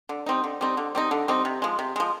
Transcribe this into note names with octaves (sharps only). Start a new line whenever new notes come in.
D3
G3 C4 D#4
D3
G3 C4 D#4
D3
G3 C4 D#4
D3
G3 C4 D#4
C3
F3 G#3
C3
F3 G#3